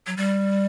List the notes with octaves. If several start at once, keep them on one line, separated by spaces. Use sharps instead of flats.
F#3
G3